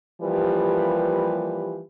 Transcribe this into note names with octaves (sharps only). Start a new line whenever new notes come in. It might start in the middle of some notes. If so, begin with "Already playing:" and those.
E3 F3 G3 A#3 G4 B4